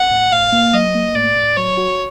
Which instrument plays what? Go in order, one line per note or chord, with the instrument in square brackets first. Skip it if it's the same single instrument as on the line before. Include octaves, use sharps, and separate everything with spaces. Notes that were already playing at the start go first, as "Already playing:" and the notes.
Already playing: [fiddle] F#5
[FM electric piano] A2
[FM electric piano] A2 [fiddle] F5
[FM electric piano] A#3
[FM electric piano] F#3 [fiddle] D#5
[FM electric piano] A#3
[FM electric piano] A2 [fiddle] D5
[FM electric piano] A2
[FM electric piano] F#3 [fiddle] C#5
[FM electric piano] F#4